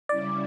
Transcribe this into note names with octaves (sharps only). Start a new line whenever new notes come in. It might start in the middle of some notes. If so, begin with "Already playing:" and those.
C#3 G3 C#4 E4 D5